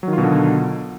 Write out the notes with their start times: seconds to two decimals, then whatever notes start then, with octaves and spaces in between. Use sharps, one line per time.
0.03 F#3
0.08 D#3
0.13 F4
0.18 B2
0.23 D3